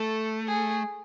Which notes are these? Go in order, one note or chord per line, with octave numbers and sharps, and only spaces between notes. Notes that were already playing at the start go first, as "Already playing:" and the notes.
Already playing: A3 A4
G#4